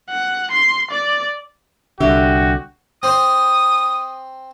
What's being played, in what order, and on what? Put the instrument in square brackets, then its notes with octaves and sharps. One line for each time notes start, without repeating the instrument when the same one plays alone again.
[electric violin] F#5
C6
D5
[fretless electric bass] C2 D3 [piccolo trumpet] F#4 [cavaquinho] G4 E5
[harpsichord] C4 C5 [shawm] D#6